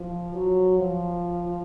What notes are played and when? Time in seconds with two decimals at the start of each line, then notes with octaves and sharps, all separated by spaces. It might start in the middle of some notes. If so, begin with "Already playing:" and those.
Already playing: F3
0.35 F#3
0.78 F3